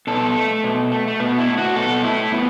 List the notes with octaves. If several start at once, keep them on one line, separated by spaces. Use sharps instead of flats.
B2 A4
A3
B2
A3
A3
B2 B3
E4
A3
F#4
B2 A4
A3 E4
A2 B3